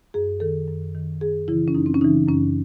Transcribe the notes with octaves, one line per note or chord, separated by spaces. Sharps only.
F#2 G#4
D#3 A4
F#2
D#3
F#2 G#4
C#3 E3 E4
C#4
F#2 D#4
C4
C#4
C#3 E3 D#4
F#2 C#4